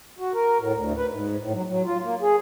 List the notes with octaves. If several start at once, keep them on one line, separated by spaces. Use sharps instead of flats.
F#4
A#4
A2
D2
B4
G#2
A2
F#3
F#3
F4
A#3
G#4